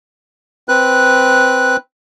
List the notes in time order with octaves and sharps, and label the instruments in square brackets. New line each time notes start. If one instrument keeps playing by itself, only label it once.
[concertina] C4 B4 F#6